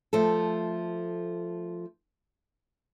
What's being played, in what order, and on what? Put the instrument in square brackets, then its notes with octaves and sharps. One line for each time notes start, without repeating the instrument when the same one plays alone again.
[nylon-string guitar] F3 A3 A4